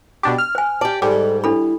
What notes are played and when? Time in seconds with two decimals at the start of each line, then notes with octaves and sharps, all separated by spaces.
0.23 B2 D4 G4
0.38 F6
0.55 C5 G#5
0.81 G4 D5 A5
1.02 G#2 G3 A4
1.44 D4 E4 A4 B5